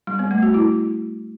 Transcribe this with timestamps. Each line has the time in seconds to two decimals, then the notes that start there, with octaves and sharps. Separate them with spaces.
0.07 G3
0.19 B3
0.31 A3
0.43 F#4
0.54 E4